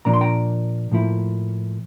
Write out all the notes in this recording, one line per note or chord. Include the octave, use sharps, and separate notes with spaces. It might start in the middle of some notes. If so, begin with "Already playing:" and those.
A#2 F3 A#3 D4 A#5
C6
G5 A#5
A2 F3 A#3 E4